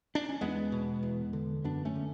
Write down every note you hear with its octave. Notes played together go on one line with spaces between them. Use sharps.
D4
C#4
E2 G#3 B3
B2
E2
D3
F#2 B3 D4
A3 C#4
D3